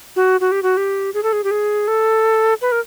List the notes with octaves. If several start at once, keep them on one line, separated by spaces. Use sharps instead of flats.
F#4
F#4
G4
F#4
G4
G#4
A4
G#4
G4
G#4
A4
B4
A#4